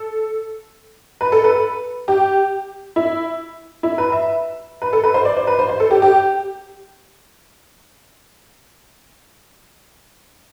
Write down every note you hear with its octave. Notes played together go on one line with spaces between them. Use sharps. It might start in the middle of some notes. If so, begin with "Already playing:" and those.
Already playing: A4
B4
A4
B4
G4
E4
E4
B4
E5
B4
A4
B4
C5
D5
C5
B4
C5
C5
A4
G4
G4